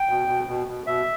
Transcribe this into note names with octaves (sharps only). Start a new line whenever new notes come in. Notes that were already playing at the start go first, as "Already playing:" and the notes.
Already playing: G5
B2
B2
B2
B2
B2 E5